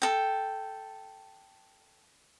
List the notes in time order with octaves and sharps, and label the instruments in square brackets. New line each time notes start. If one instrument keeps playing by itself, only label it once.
[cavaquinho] A4 G5